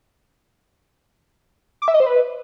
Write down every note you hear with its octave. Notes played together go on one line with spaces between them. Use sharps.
D6
E5
D#5
C5
B4